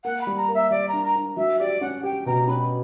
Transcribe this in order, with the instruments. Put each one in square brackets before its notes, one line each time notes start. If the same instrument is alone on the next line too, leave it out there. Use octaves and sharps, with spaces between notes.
[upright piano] A#3 [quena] F#5
[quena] B5
[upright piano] G3
[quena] A#5
[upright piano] A#3
[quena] E5
[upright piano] G3 [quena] D5
[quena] A#5
[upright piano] D4
[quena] A#5
[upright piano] D4
[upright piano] F#3 [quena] E5
[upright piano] G4 [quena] D5
[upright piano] C#4 [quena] F#5
[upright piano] G4 [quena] G5
[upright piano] B2 [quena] A#5
[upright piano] C#4 [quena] B5